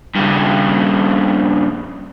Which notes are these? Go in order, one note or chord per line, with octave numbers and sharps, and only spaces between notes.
G2 C#3